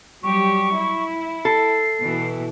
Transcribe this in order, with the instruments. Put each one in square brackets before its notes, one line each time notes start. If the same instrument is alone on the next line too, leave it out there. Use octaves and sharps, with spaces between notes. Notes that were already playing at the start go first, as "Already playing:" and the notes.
[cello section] F#3 G3 G4 [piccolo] C#6
[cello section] E4
[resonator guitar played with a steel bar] A4 [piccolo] C7
[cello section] B2 E3